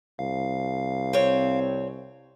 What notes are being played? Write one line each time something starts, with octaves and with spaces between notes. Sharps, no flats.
C2 F5
C4 C#5